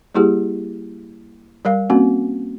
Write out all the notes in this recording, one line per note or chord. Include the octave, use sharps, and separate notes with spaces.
G3 A#3 E4 G4 G#4
G3 A#4 F5
A#3 C4 C#4 F#4